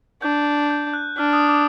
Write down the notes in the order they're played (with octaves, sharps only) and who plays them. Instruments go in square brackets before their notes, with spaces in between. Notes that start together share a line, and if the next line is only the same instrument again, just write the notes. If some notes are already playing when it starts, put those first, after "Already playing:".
[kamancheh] D4 [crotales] G6
[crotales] G6
F#6
[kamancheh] D4 [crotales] F6
[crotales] D#6
D6